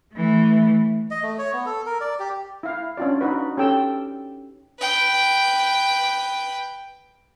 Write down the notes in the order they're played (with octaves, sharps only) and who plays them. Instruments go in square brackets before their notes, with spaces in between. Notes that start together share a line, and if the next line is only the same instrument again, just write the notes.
[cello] E3 A3
[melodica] D#5
A3
C#5
B3
A4
A#4
D5
G4
[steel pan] E4 F5
C#4 D4 F4 F#4 D5
D#4 F#4 B4
C#4 G4 A4 G5 E6
[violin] B4 G5